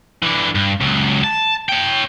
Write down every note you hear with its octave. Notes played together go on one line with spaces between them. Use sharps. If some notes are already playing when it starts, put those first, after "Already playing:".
D3 E3
G2
C#2 F#3
A5
C#5 G5